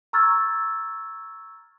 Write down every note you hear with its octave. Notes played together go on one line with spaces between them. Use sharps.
A#5 C#6 E6 F6 G#6 A6